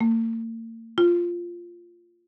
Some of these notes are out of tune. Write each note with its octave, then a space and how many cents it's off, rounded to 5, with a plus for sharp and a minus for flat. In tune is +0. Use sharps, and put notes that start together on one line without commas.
A#3 -45
F4 -5